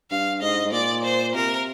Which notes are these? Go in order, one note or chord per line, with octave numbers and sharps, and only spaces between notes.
G2 F5
G#2 D#5
G#2
A#2 D5
C5
C3 A#4